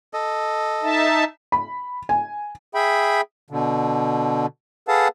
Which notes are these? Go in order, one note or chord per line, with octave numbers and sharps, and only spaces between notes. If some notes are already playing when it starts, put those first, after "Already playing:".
A4 D#5
D#4 E5 A5
B5
G#5
G#4 E5 G5 B5
B2 D3
G#4 A4 B4 F5 F#5 A5